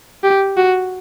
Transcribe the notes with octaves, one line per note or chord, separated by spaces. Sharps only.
G4
F#4